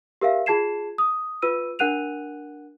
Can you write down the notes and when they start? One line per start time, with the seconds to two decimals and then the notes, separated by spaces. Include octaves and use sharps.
0.21 G4 A#4 E5 F5
0.46 F4 G#4 A5 G#6 C7 E7
0.98 D#6
1.42 F4 B4 E6 D#7
1.79 D4 A#4 F#5 F#6 D#7 F7